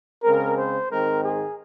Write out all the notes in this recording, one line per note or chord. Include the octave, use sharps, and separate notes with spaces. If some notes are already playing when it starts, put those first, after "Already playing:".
C#3 G#3 C4 A#4
C5
G#2 D#3 G#3 C4 A#4
G#4